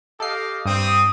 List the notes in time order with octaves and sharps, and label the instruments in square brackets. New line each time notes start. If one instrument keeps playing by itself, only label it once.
[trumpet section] G4 D#5 F5 [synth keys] A4 C7
[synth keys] G2 D7 [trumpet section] C4 G4 D#6